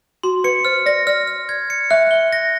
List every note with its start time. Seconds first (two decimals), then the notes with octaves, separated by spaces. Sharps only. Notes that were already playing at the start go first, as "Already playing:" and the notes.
0.23 F#4 C6
0.44 B4 C#7
0.65 C5 F6
0.86 D5 A#6
1.07 D5 F6
1.27 F6
1.49 G#6
1.70 C#7
1.90 E5 F#6
2.11 G7
2.33 A#6